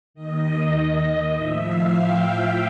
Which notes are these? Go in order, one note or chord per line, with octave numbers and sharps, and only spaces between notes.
D#2 D#3 D#5
A2 F3 E5
F5
G5